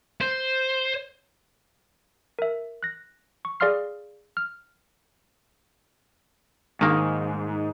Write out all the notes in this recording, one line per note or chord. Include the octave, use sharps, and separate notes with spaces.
C5
A#4 E5
F#6 A#6
C#6
G#4 D5 F5 C6 F6 C7
F6
G#2 D#3 A#3